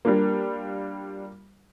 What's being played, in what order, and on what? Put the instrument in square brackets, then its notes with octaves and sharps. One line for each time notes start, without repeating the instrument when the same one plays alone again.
[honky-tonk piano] G3 D4 F4 [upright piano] A#3